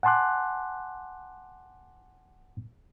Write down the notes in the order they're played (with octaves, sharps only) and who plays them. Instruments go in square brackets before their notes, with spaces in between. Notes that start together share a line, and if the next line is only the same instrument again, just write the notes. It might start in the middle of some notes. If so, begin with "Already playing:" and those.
[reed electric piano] F#5 G#5 A5 C6 D6 F#6